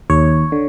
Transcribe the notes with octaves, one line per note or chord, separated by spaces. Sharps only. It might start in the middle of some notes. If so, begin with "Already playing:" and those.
D#2 C#5
D3